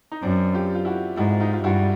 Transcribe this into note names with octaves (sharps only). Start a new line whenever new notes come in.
D#4
F#2 C4 D4
F4 G4
F4
E4 F#4
G#2 E4 F#4
D#4 F4
F4
G2 E4 F#4